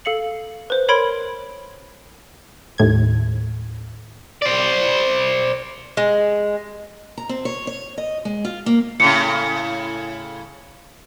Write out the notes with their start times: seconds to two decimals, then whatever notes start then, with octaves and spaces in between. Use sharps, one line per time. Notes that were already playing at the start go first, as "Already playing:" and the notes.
0.05 A4 F5 C#7 F#7
0.70 B4 C5
0.88 A#4 C#5 B5 C6 G#6 D7
2.78 D#2 A2 G#6
4.42 C5 D5
5.97 G#3
7.17 A#5
7.29 C4
7.45 C#5
7.67 C#5
7.98 D#5
8.25 G#3
8.45 F4
8.66 A#3
9.00 A2 C#3 C#7